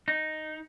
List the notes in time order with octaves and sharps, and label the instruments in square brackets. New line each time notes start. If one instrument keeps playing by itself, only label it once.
[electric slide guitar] D#4